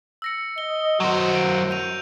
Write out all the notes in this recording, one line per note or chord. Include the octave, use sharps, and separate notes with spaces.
E6 A#6 C#7
D#5 G7
F#2 F#3 F#4 C5
D7
G6 D#7 F7